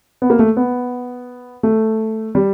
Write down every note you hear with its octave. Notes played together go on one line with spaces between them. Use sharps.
B3
A#3
A3
B3
A3
G3